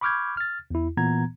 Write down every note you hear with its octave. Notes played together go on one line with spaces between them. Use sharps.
B5 C#6 D6 F6 G6 G#6
F6 A6
E2 E4
A#2 E3 B3 A#5 G#6